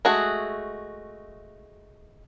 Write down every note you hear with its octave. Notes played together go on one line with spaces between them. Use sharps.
G#3 A3 F#4 G#4